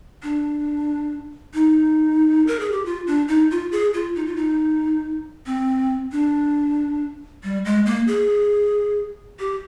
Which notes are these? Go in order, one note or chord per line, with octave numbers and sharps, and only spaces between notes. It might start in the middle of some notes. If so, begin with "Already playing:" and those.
D4
D#4
A#4
G#4
G4
F4
D4
D#4
F4
G#4
F4
D#4
F4
D#4
C4
D4
G3
G#3
A#3
G#4
G4